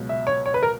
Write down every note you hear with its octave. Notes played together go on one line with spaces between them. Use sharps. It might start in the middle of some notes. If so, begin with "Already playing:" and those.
Already playing: C#2 B2 F#3
E5
C#5
C#5
B4
A#4